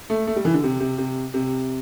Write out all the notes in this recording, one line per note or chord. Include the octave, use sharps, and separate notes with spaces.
A3
A3
G3
E3
D3
C3
C3
C3
C3